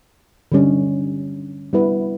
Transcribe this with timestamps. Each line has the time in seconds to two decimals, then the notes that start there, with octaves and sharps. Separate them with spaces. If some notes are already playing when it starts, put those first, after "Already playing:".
0.52 D3 G3 C#4
1.73 G3 B3 E4 B4